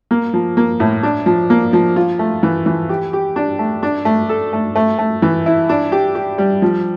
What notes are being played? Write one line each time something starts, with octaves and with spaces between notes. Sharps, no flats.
A#3
F3
A#3
A2
D4
F3
A#3
F3
F4
A3
E3
E3
G4
G4
D4
A3
D4
A3
A4
A3
A3
A3
E3
E4
D4
G4
G4
G3
F3